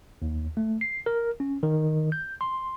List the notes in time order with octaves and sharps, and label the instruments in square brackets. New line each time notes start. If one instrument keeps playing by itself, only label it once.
[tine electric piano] D#2
A3
C7
A#4
C#4
D#3
G6
C6